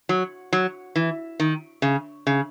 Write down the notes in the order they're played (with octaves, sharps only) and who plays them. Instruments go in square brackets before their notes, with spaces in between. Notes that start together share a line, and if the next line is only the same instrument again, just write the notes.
[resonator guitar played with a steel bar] F#3
F#3
E3
D#3
C#3
C#3